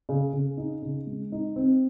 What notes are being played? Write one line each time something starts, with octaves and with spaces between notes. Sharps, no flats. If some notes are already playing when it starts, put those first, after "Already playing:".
C#3
C#3
D#4
C#3
G#3
D#4
C4